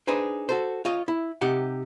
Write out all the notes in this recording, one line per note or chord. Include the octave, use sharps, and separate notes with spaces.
D4 D#4 G#4 B4 C5
F#4 A4 C5
F4 C#5 D#5
E4
C3 D#4 G4 F#5